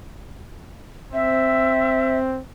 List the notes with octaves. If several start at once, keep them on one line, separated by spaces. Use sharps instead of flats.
C4 E5